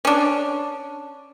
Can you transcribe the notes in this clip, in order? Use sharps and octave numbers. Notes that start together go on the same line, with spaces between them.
C#4 D4